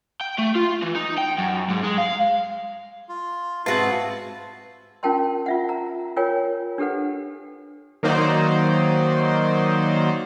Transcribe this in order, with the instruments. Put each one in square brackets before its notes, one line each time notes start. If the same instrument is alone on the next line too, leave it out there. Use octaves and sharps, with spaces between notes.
[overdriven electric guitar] G5
A3
F4
E3
D#4
G5
F#2
G#2
G#3
F5
[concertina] F4
[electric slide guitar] G#2 F4 [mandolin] C4 F#4 A5 [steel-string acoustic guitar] G#4 B4 [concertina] E5
[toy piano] C#4 F4 A#4 G5 A5 C6
F4 E5 F#5
A#5
F4 A#4 C#5 G5 G#5
D4 G4 A4 B4 F#5
[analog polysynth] D#3 F#3 A#3 D#4 C5 D5